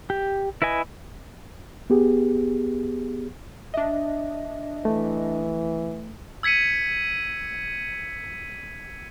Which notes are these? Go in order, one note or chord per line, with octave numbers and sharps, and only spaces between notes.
G4
E4 B4 D#5 G#5
B3 G4 G#4
D4 D#5 E5
E3 A3
E6 G#6 B6 C#7 D#7